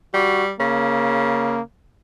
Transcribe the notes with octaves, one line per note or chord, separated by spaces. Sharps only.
G3 F#4
C#3 A#3